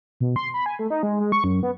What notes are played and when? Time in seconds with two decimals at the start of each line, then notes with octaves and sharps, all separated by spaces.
0.21 B2
0.36 C6
0.54 B5
0.66 G#5
0.79 A3
0.90 D#4
1.03 G#3
1.20 G#3
1.32 C#6
1.44 F#2
1.63 B3